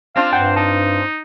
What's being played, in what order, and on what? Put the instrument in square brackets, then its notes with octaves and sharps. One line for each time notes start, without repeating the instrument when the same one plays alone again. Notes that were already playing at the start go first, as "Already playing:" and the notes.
[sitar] C4 D4 F4 [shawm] F5
[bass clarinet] G2 [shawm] C5 [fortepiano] F#5 G5
[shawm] D#4 [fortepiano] A5